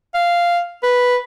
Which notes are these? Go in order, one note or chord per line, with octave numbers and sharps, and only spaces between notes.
F5
B4